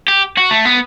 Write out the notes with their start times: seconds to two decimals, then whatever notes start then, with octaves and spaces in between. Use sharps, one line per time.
0.08 G4
0.37 F#4
0.51 A3
0.66 B3